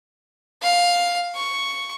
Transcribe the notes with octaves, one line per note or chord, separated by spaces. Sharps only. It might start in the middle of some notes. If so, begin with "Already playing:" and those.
F5
C#6